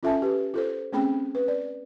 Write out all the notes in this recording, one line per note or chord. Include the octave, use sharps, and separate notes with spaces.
C#4 F4 A4 E5 G#5 A5
G4 B4
F4 A4 C5
A3 C4 C#4 G#4 G5 B5
B4
D5